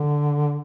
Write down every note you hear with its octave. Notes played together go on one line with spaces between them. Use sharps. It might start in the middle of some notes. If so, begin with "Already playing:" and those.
Already playing: D3